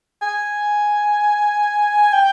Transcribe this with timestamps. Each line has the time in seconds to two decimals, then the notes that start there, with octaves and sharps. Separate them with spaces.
0.22 G#5
2.13 G5